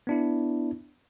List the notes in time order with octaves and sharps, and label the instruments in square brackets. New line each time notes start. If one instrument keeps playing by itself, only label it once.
[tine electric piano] B3 D4 E4